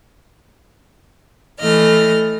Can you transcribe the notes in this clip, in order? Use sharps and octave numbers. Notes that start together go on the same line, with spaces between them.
E3 A3 D#5 F6